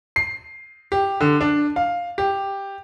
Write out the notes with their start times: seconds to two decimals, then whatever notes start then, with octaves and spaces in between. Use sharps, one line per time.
0.16 C7
0.92 G4
1.21 D3
1.41 D4
1.76 F5
2.18 G4